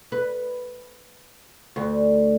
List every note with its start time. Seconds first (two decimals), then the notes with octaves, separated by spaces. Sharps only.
0.12 B4
1.76 D2